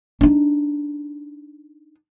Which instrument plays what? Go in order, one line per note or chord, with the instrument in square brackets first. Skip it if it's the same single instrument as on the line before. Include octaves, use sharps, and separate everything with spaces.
[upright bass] D4 D#4